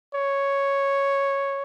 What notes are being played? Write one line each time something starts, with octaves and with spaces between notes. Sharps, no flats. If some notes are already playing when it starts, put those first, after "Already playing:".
C#5